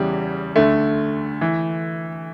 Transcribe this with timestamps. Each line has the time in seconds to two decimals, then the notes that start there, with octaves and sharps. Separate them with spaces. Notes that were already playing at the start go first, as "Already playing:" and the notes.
Already playing: E2 C#3 E3 G3
0.56 D2 D3 A3
1.41 E3